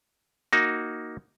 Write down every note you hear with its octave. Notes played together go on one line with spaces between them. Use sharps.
A#3 D#4 F#4